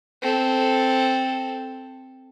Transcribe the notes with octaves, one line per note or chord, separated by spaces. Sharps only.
C4 A4